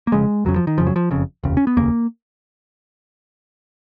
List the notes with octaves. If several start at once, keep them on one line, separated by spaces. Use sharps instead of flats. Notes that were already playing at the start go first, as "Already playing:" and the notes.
A#3
F1 F2 C#3 G#3
F1 F2 C#3 F#3
F3
D#3
F#1 F2 C#3 F3
F#3
F3
F#1 F2 C#3
F1 D#2 C#3
C#4
B3
F1 D#2 C#3 A#3